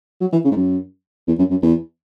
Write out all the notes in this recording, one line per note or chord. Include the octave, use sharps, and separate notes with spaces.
F#3
E3
C#3
G#2
F#2
E2
F#2
F#2
E2